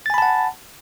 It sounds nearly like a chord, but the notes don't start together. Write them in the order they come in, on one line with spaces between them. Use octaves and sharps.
A6 G#5 B5 A5 F#5